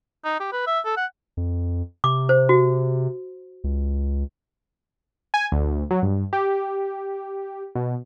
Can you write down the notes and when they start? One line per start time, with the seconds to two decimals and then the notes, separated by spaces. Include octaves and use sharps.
0.25 D#4
0.40 G4
0.52 B4
0.67 E5
0.85 A4
0.97 F#5
1.37 F2
2.04 C3 D6
2.29 C5
2.49 F#4
3.64 C#2
5.34 G#5
5.52 D2
5.91 F#3
6.02 G2
6.33 G4
7.75 B2